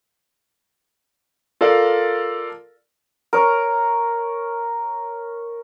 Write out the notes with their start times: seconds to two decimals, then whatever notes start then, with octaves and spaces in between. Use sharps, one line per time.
1.61 F4 A4 A#4 D5 F5
3.33 A#4 C#5